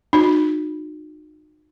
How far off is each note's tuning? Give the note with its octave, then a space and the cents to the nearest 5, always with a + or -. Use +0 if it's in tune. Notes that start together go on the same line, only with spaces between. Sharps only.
D#4 -35 F#4 -40